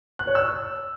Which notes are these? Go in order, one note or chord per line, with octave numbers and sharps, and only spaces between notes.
F#6
C#5
E6